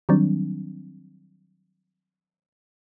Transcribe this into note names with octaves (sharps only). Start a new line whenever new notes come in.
D#3 F#3 G3 C4 D4